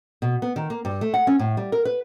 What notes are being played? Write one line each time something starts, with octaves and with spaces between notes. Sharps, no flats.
B2
B3
D#3
A#3
G2
A3
F#5
C#4
A2
G3
A#4
B4